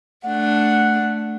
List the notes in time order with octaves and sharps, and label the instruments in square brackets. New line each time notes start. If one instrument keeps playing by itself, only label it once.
[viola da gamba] A3 D4 [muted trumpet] F#5